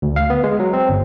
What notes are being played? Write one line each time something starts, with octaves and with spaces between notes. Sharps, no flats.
D2
F5
B3
G#3
F#3
C4
G1